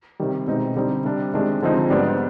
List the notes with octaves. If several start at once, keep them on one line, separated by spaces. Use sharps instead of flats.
C3 D#3 G3
B2 G#3 C4 D#4
D3 G3 C4 D#4
C3 G3 D4
C3 D#3 G#3 D4
D3 F3 G#3 C4 D#4
G#2 G3 B3 D4